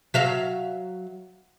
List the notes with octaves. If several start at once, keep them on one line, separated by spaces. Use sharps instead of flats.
F#3 E5 F5